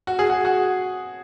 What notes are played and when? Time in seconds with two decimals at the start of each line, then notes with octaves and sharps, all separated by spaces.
0.07 F#4
0.19 G#4
0.30 F#4
0.45 F#4